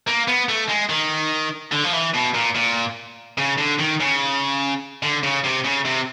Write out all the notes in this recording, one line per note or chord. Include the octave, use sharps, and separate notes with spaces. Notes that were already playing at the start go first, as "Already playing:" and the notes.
A#3
B3
A3
G#3
D#3
D3
F3
E3
B2
A#2
A#2
C#3
D3
D#3
C#3
D3
C#3
C3
C#3
C3